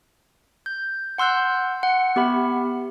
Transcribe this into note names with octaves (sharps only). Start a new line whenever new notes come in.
G6
F#5 C6 E6 F#6 G6
F#5 C#7
B3 G4 E5 B5